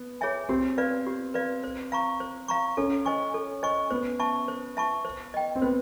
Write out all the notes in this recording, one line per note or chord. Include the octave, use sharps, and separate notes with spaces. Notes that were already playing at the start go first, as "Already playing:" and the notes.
Already playing: B3
G#4 C#5 E5 G#5
C4 G4
B4 D5 F5
G4
B4 D5 F5
C5
F5 A#5 C#6
C5
F5 A#5 C#6
C#4 A4
C5 D#5 G#5 C#6
A4
C5 D#5 G#5 C#6
B3 C5
E5 A5 C#6
C5
E5 A5 C#6
C5
D#5 G5
C4
B3 C5